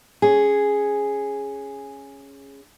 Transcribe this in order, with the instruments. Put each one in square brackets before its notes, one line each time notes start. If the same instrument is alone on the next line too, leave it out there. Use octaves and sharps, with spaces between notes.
[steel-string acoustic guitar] C#4 G#4